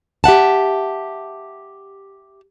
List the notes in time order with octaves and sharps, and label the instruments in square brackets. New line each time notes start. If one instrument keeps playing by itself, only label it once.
[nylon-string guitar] G4 E5 F#5 A5